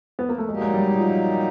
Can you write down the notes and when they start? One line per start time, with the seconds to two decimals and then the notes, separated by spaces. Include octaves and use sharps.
0.19 B3
0.29 A#3
0.38 A3
0.49 A#2 F#3 G#3 A#3 D#4 G4
0.62 G#3
0.74 G3
0.97 F3